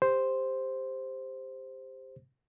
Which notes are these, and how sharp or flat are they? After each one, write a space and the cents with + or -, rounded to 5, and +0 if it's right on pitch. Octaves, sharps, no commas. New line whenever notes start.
G4 +20 C5 +0